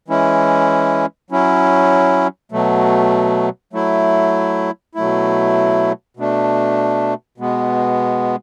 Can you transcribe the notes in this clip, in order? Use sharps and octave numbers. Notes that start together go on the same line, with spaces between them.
E3 G#3 C#4 E4
F#3 C#4 E4
B2 F#3 A3
F#3 A3 E4
B2 F#3 A3 E4
B2 A3 D4
B2 G#3 B3